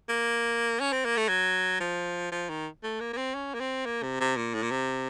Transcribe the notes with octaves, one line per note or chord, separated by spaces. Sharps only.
A#3
C#4
C4
A#3
A3
F#3
F3
F3
D#3
A3
A#3
A#3
C4
C#4
A#3
C4
A#3
C3
C3
A#2
A2
A#2
C3